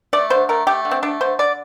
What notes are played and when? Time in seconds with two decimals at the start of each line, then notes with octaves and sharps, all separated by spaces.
0.13 A3 D5
0.30 D3 C5
0.49 A3 A#4
0.67 A3 G4
0.85 D3
0.91 C4
1.03 A3 D4
1.21 D3 C5
1.39 D3 D5